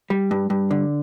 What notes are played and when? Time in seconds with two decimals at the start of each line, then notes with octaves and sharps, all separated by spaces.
0.10 G3
0.31 G2
0.50 G2
0.71 D3